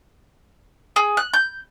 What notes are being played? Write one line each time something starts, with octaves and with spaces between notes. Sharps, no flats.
G#4
F#6
G6